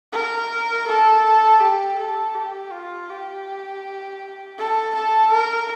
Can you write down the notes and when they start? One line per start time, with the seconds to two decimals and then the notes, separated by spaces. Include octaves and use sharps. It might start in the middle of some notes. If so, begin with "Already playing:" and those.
0.13 A#4
0.87 A4
1.60 G4
1.98 A4
2.35 G4
2.72 F4
3.09 G4
4.58 A4
4.95 A4
5.31 A#4